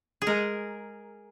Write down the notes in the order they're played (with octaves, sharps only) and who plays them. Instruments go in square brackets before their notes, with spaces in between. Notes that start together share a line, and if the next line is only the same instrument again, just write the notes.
[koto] G#4
[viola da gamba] G#3 [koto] A#4